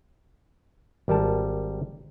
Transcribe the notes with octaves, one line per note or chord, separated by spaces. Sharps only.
G#1 G3 A#4 A5